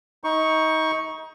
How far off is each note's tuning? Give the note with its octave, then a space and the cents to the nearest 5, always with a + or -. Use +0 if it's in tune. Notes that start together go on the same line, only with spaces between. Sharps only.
D#4 +25 C#6 +0